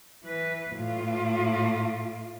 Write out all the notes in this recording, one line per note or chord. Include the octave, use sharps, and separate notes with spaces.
E3 B4
A2 F4